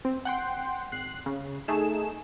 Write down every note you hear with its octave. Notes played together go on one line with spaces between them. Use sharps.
C4
F#5 G5 C6
G#1 F#6 C7
C#3
A3 D#4 G#4 E7